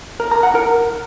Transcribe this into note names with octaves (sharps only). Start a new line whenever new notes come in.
A#4
A#5
F#5
A#4